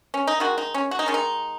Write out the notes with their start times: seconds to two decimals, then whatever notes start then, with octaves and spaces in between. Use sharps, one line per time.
0.14 C#4
0.27 D#4
0.40 D#3 G#3 F#4
0.58 D#4
0.74 C#4
0.91 F#4
0.99 D#4
1.06 D#3 G#3 C#4
1.14 D#4